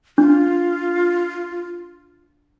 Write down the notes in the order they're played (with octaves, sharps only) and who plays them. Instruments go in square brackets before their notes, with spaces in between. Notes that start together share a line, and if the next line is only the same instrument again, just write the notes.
[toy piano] D4 [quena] F4